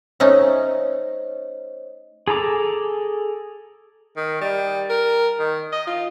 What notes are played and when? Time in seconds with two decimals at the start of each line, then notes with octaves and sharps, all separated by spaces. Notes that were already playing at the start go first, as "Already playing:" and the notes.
0.20 A3 C#4 D#4 C5 C#5 D#5
2.28 G#4 A4 A#5 D6
4.16 D#3
4.41 G3
4.90 A#4
5.39 D#3
5.72 D#5
5.87 F4